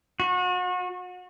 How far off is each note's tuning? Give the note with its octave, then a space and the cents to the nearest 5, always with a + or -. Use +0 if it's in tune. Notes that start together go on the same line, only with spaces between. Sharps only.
F#4 -35